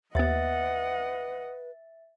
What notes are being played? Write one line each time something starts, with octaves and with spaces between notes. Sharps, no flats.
D#2 B3 B4 D#5 E5 F#5 A6